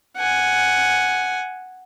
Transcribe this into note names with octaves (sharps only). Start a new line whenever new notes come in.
F#5 G#5